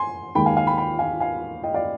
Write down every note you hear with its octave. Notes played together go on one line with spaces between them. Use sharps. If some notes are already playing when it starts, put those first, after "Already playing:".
Already playing: G#5 C6
D#2 D#3 G#3 G5 B5
F5 G#5
F5 G#5
G5 B5
G5 B5
F5 G#5
F5 G#5
D#5 G5
D5 F5